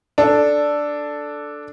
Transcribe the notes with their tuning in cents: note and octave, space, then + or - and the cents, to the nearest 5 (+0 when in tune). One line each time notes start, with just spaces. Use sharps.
D4 +0 A4 +0